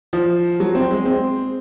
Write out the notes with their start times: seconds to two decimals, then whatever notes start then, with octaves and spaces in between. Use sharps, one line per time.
0.13 F3
0.60 F#3
0.75 C4
0.91 G#3
1.06 C4